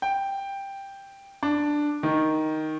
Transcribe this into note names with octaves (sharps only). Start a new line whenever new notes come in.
G5
D4
D#3